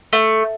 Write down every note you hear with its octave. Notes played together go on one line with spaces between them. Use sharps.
A3